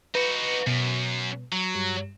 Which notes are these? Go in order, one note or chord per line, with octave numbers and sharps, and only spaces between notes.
D#4 F#4 B4
F#2 B2
F#3
G2